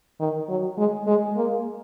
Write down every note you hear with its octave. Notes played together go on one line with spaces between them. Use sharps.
D#3
F#3
G#3
G#3
A#3